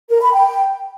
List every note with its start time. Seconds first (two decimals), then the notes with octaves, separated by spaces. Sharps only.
0.10 A#4
0.21 B5
0.33 G5